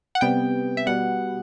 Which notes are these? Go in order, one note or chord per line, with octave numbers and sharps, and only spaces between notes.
F#5
C3 G3 B3 G5
E5
B2 G3 B3 F#5